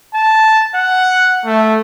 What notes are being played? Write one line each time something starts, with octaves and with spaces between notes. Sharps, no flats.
A5
F#5
A3